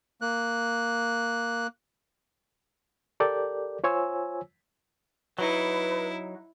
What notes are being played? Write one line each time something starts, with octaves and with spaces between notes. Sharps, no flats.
A#3 F#6
G4 A4 A#4 D5 G6
F4 C5 C#5 G#5 E6
F#3 D#4 E4 B4